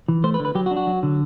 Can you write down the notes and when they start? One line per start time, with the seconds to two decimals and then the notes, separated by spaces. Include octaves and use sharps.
0.08 E3
0.24 A3 C5
0.34 B4
0.40 D3
0.45 B4
0.55 F#3 G4
0.66 F#4
0.71 D4
0.76 F#4
0.87 F#3
1.03 D3